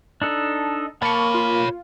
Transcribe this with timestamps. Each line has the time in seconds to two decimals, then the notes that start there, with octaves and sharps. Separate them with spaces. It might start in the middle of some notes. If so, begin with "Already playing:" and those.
0.22 D4 D#4 A4
1.02 A#3 C#5 A5 B5 C#6
1.34 F4